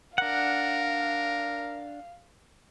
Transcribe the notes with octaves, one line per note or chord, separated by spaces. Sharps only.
D4 A#4 F5 F#5